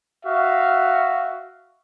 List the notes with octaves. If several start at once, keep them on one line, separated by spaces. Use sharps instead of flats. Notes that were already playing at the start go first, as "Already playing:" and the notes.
F#4 E5 F5